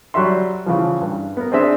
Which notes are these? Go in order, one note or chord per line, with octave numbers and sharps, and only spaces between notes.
F#3 G3 F#4 E5 C6
C#3 E3 F3
G2
B3 A#4
C4 D4 G#4 C5 E5